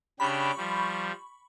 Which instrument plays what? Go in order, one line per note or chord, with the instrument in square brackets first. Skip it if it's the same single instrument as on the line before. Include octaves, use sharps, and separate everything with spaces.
[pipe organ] C#3 D4 G4 [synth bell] B5 C#6
[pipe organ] F3 G3